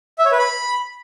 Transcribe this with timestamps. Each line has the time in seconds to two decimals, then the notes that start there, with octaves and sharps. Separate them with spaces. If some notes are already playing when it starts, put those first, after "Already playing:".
0.18 E5
0.25 C#5
0.32 B4
0.38 B5